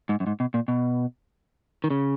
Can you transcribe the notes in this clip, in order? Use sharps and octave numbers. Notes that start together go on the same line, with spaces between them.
G#2
F#2
G#2
B2
A#2
B2
D#3
C#3